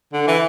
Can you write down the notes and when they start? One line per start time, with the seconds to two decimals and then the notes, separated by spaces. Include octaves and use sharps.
0.13 D3
0.28 E3